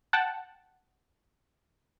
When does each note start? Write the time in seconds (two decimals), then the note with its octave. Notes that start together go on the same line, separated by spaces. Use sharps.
0.13 F#5 G5 A5